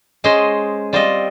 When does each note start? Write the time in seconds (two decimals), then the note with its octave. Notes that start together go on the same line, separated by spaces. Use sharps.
0.24 G#3 C#4 G#4 C5 D#5
0.93 G3 C4 F4 C5 D#5